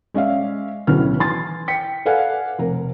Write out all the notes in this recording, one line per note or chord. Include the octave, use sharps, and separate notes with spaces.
G#3 C#4 D5 E5 F5
D2 A2 F#3 B3 C#4 F6
E3 G#5 C6 A6
G5 B6 C#7
A4 B4 D5 F5 F#5 G#5
F1 A#4